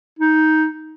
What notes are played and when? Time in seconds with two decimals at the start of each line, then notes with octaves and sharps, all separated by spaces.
0.19 D#4